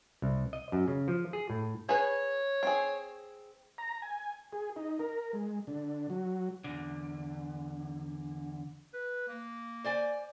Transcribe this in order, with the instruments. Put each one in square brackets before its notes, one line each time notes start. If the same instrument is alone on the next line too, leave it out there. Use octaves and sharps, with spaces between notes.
[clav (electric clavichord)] C2
D#5
F#2
C#3
F3
G#4
A2
[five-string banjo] G#4 B4 [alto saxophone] C#5
[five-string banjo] C4 G#4
[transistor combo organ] A#5
G#5
G#4
D#4
A#4
G#3
D3
F#3
[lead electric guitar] E2 D3
[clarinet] B4
A#3
[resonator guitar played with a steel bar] C5 D5 G#5